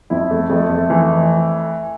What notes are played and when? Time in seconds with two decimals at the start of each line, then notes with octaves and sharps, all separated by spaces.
0.10 F2 E4
0.31 A3
0.50 F2 A3
0.70 A3
0.90 E3